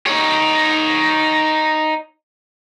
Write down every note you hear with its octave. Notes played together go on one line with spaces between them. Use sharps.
D#4 C#5